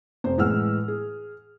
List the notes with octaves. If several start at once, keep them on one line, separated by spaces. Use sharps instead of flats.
F1 C5
A2 E3 G#3 F#5 E6 F6
G#4